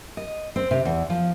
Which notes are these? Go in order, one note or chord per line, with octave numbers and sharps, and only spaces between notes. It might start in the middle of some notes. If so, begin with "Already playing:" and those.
D#5
C4
C3
E2
F3